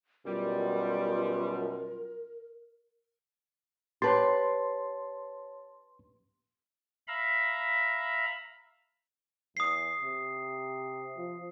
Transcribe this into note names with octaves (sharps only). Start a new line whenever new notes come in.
F#2 B2 G3 F4 A#4
G4 B4 C#5 A5 C6 A6
E5 F5 A#5 B5
E2 D#6 C7
C3
F3